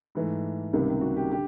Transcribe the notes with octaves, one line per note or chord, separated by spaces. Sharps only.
G#2 E3 A3
C#2 C3 D#3 G3 A#3
F#4
G4
D3 G4